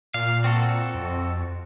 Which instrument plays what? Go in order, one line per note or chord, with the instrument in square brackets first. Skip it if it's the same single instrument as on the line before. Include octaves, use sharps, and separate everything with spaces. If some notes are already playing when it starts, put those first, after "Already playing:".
[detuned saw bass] A#2 [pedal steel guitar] F5
[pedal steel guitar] C4 F#4 A4
[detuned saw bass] F2